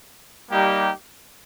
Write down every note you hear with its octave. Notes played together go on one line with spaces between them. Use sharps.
G3 A#3 D#4 G4